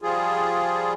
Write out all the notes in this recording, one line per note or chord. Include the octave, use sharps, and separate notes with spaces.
F3 G3 F4 G#4